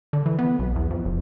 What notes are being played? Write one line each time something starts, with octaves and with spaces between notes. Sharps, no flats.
D3
E3
B3
B1
E2
F2
F1